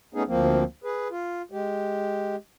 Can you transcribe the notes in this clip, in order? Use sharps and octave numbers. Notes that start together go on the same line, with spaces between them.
A3 B3 C#4 D#4 G#4
D2 F3 A#3 C4
G#4 B4
F4
G#3 G4